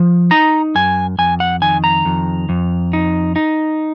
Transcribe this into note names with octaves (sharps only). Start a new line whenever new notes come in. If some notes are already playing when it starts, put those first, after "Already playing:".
Already playing: F3
D#4 A#5
F#2 G#5
F2 G#5
F#5
D#3 G#5
A#5
F2
F2
D#4
D#4